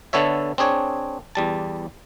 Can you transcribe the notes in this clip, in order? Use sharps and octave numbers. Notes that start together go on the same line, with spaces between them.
D3 B3 A4 C#5 E5
C4 D4 G#4 C#5
E2 G3 A5